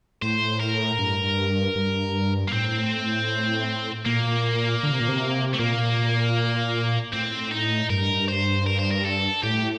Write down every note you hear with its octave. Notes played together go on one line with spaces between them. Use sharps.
A2 C5
A#4
G2
G2
A#3
A2 C4
A#2 A#3
D3
C3
A#2
C3
A3
A#2 A#3
A2 C4
D#4
G2 A#4
C5
A#4
C5
A#4
A4
A2 G4